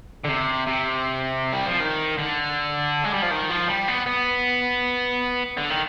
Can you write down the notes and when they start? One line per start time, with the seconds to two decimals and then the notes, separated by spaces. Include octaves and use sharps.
0.25 D3
0.29 C3
0.67 C3
1.53 G3
1.66 F3
1.80 D#3
2.18 D3
3.04 G#3
3.13 G3
3.22 F3
3.31 D#3
3.50 F3
3.68 G3
3.88 B3
4.06 B3
5.57 D3
5.70 D#3